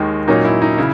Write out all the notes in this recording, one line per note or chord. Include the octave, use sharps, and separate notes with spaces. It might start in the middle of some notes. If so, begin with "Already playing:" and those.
Already playing: D#2 D#3 G#3
A#2 F#3 A#3 C#4 D#4
E4
D#4
C#3 E4